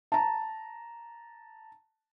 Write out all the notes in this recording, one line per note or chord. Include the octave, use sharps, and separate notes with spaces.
A5 A#5